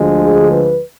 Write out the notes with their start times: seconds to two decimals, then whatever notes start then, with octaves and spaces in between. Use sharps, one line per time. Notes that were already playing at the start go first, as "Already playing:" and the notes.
Already playing: D2 D3 F3 G#3
0.21 G#4
0.50 B4